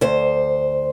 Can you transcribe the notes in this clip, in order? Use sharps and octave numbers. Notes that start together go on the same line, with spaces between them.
D2 C5